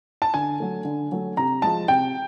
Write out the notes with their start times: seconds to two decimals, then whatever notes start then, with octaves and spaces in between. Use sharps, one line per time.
0.22 A5
0.34 D3 G#5
0.60 F#3 A3
0.85 D3
1.12 F#3 A3
1.37 C3 A#5
1.62 F3 G#3 A5
1.88 C3 G5